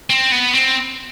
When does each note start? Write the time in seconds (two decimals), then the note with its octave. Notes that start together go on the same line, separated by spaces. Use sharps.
0.10 C4
0.32 B3
0.55 C4